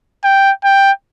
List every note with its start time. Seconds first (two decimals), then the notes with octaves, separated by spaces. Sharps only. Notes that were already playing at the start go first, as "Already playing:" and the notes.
0.24 G5
0.64 G5